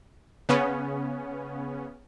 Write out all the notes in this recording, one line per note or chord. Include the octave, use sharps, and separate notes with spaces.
C#3 B3 C#4